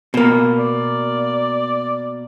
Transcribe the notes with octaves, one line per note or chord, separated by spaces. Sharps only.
B2 A#3
D5